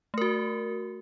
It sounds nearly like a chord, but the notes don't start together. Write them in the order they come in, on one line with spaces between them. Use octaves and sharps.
A3 A#4 F#4